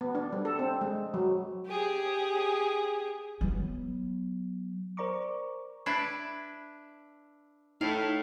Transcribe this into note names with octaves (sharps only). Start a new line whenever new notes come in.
B3
D4
G3
A4
C4
G#3
F#3
G4 G#4
F#3 B3
A#4 C5 D5 A#5 C#6 D6
D4 E4 B4 B5 G#6 C7
A2 D#4 F5